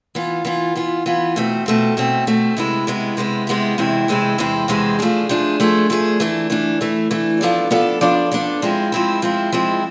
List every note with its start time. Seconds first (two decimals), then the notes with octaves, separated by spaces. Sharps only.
0.15 E3 B3 F4
0.45 E3 B3 F4
0.76 E3 B3 F4
1.06 E3 B3 F4
1.36 B2 A3 C4
1.66 B2 A3 C4
1.97 B2 A3 C4
2.27 B2 A3 C4
2.57 C3 G#3 B3 E4
2.87 C3 G#3 B3 E4
3.17 C3 G#3 B3 E4
3.47 C3 G#3 B3 E4
3.78 E2 C3 G#3 C4 E4
4.08 E2 C3 G#3 C4 E4
4.38 E2 C3 G#3 C4 E4
4.68 E2 C3 G#3 C4 E4
4.99 F3 A3 D4 G#4
5.29 F3 A3 D4 G#4
5.60 F3 A3 D4 G#4
5.90 F3 A3 D4 G#4
6.20 E3 A3 D4
6.50 E3 A3 D4
6.81 E3 A3 D4
7.11 E3 A3 D4
7.41 F3 B3 D4 A4 D5
7.71 F3 B3 D4 A4 D5
8.01 F3 B3 D4 A4 D5
8.32 F3 B3 D4 A4 D5
8.62 F3 G#3 C4 E4
8.92 F3 G#3 C4 E4
9.22 F3 G#3 C4 E4
9.52 F3 G#3 C4 E4